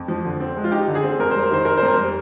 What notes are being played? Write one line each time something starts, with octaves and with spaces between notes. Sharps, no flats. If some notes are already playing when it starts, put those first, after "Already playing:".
Already playing: F2
F3
D3
C4
G#3
F4
D#4 G4
D3
G#4
C4
F2 A#4
G3 C5
A#4
D#3 C5
C4 A#4
C5
F2
A#4
G3